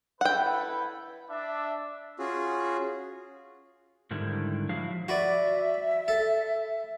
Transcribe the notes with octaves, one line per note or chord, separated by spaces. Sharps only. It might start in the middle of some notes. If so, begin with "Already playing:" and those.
E4 A4 B4 F#5 G5
D4 E5
C#4 F4 F#4 G#4
G#2 D3 D#3 G3 E4
F3 F#3 E4 F#4 F5
F#4 B4 D5 E5
A4